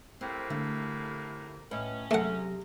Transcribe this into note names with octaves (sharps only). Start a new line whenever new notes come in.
A2 C3 A#3 C4
D3 A3
A2 C#4 B4 D#5 E5
C3 F#3 A3 G#4 F#5 A#6